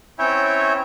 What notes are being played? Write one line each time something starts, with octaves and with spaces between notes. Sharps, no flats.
C4 C#4 E4 C#5 E5 G5